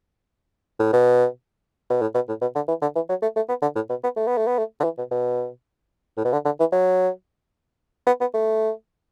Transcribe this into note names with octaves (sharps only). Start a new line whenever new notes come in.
A2
B2
B2
A2
B2
A2
B2
D3
E3
D3
E3
F#3
A3
A3
B3
D3
A2
B2
B3
A3
B3
A3
B3
A3
D3
E3
B2
B2
A2
B2
D3
D3
E3
F#3
B3
B3
A3